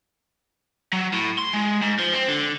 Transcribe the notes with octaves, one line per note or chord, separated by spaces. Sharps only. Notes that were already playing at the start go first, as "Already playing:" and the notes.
F#3
A2
C6
G#3
G#2
F3
C4
D3